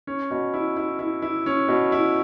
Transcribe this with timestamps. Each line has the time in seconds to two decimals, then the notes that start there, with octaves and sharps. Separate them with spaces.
0.07 C#4
0.31 B2
0.54 E4
0.77 E4
0.99 E4
1.22 E4
1.46 C#4
1.68 B2
1.92 E4